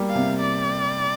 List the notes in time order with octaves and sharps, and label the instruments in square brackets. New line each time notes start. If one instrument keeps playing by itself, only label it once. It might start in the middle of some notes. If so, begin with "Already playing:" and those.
Already playing: [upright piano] G3 A#3
[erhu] F5
[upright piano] C3
[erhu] D5